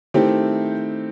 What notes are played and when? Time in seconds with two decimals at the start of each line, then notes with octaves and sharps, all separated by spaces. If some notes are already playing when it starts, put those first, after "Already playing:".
0.14 D#3 A3 C4 E4 G4